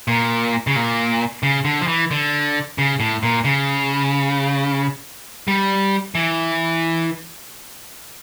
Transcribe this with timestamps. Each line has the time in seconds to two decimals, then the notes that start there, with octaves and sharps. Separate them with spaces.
0.08 A#2
0.67 C#3
0.76 A#2
1.43 C#3
1.65 D3
1.81 F3
1.88 E3
2.11 D3
2.78 C#3
3.00 A2
3.23 A#2
3.45 C#3
5.48 G3
6.15 E3